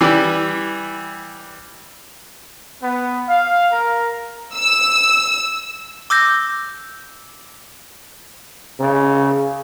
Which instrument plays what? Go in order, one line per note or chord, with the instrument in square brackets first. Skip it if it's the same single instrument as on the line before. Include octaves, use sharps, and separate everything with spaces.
[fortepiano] E3 G3 E4
[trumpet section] B3
F5
A#4
[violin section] E6
[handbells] D6 E6 G6 A#6
[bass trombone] C#3